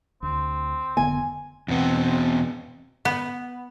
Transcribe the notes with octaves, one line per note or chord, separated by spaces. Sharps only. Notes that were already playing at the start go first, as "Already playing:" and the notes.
D2 C4
F1 D3 B3 G#5
E2 B2 B3 C4
B3